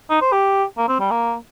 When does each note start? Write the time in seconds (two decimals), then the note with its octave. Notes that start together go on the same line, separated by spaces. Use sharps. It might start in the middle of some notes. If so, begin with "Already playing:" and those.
0.10 D#4
0.21 C5
0.32 G4
0.78 A#3
0.88 C4
1.00 G3
1.11 A#3